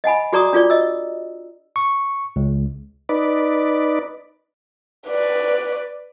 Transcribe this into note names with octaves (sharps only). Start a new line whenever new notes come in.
D#5 F#5 G#5 B5
F#4 G#4 D5 A#5 C#6 D#6
D4 F4 G#4 D5
D#5 E6
C#6
C#2
D#4 B4 D5
B4 D5